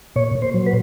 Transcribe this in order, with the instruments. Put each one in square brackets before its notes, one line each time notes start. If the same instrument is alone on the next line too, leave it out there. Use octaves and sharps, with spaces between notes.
[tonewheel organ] A#2 C#5
A#2
C5
F#3
B4